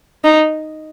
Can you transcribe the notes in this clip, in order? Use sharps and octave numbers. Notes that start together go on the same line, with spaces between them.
D#4